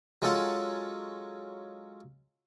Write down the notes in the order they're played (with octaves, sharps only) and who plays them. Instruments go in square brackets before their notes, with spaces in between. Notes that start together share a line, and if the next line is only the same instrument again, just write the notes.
[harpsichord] F#3 G#3 C#4 F4 A4 F#5